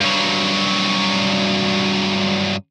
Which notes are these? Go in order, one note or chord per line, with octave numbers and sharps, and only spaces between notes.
G2 F#3